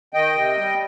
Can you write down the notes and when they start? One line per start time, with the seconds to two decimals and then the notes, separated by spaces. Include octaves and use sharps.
0.14 D#3 D#5 G5
0.35 C3
0.58 G3